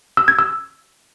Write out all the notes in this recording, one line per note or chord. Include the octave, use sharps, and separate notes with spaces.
E6
G#6
E6